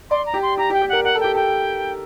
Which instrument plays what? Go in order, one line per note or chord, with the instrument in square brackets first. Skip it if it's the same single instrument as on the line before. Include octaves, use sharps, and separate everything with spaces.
[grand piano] D5 [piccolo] C6
[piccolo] A#5
[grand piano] G4
[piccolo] C6
[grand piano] G4 [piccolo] A#5
[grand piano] G4
[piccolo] G5
[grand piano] G4
[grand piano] A#4 [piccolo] F#5
[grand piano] A#4 [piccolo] F#5
[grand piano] A4
[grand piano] G4 [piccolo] G5
[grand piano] A4 [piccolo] G5